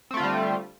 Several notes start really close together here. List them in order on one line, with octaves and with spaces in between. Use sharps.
C4 A3 F4 D3 G3